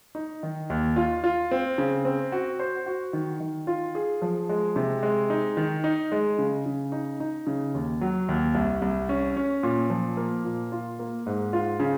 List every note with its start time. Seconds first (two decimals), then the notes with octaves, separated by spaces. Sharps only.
0.15 D#4
0.43 D#3
0.70 D#2
0.96 F4
1.24 F4
1.51 C4
1.78 C#3
2.05 C4
2.32 F#4
2.60 C5
2.86 F#4
3.13 D#3
3.40 D#3
3.67 F4
3.95 G#4
4.22 F3
4.49 G#3
4.76 C3
5.03 G#3
5.30 D#4
5.57 D#3
5.84 D#4
6.12 G#3
6.38 C#3
6.66 C#3
6.92 D#4
7.20 D#4
7.47 C#3
7.74 D#2
8.01 F#3
8.29 D#2
8.55 C2
8.82 C2
9.09 C#4
9.37 C#4
9.63 A#2
9.90 F3
10.17 A#3
10.44 A#2
10.72 F4
10.99 A#3
11.26 G#2
11.53 F4
11.80 C#3